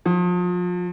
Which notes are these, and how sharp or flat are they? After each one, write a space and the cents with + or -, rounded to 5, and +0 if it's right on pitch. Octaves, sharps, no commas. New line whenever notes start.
F3 +35